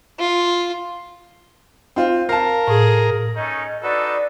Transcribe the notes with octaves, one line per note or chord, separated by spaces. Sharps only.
F4
C4 F4
A#4 F5 A5
A2 G#4
A3 C#4 D#4 D#5
D4 D#4 F#4 A4 B4 D5